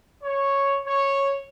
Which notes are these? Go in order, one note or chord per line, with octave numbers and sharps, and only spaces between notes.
C#5
C#5